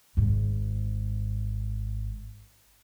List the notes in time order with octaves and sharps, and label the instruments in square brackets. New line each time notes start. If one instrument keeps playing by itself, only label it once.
[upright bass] G#1 G#2